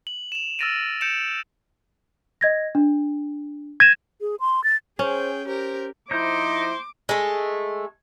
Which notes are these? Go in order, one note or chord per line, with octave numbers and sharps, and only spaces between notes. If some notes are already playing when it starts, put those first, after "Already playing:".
F#7
E7 F7
E6 F6 A6 A#6 D7 D#7
G6 C#7 D7 E7 F7
D#5 G#6 A#6
D4
G#6 A#6 D#7 E7
G#4
C6
A6
C#4 G#4 C5 G5
G4 A#4 C5
F3 D#4 E4 C5 D6 G6
G#3 A3